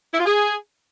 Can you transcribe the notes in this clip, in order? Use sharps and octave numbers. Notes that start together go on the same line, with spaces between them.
E4
F4
G#4